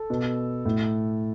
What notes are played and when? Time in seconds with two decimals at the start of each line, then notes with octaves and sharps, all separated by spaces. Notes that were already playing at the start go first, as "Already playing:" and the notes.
Already playing: A4
0.10 B2
0.65 A2